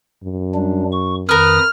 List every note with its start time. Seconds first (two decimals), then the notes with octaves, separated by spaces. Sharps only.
0.24 F#2
0.55 G3 D4
0.92 C#6
1.29 F2 D#3 A#4 B4 D#6 F6